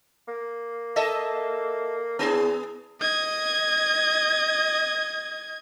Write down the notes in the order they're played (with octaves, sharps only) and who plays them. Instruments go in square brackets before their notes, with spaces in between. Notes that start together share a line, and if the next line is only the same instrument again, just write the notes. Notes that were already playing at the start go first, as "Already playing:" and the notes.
[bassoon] A#3
[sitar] A4 D#5 E5
[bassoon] E2 [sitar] B3 G#4
[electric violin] D#5 G#6